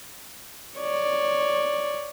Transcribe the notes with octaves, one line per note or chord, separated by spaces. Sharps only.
C#5 D5